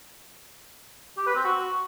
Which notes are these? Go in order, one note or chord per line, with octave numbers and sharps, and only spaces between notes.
G4
B4
C4
F#4